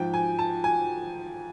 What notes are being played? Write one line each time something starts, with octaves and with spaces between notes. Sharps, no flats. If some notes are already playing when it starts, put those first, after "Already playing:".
Already playing: G#2 F3 G5
G#5
A5
G#5